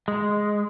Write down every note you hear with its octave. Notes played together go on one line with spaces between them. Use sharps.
G#3